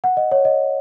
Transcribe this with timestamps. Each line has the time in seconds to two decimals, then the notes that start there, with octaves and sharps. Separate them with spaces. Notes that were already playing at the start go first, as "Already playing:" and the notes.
0.04 F#5
0.17 D#5
0.32 C#5
0.45 D#5